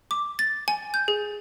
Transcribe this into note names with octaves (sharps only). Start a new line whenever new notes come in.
D6
A6
G#5
G6
G#4